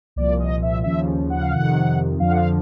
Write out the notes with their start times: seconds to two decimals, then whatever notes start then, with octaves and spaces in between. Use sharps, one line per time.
0.16 C2 A#2 F3 D5
0.40 D#5
0.62 E5
0.84 D#2 C#3 F3 E5
1.30 F#5
1.41 F5
1.51 F2 C3 D#3 F#5
2.20 F2 D3 F3 F5
2.31 F#5
2.37 F5